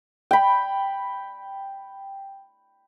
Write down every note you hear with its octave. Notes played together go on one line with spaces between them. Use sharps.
G5 B5